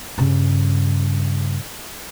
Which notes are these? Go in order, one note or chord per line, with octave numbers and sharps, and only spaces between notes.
G2 C#3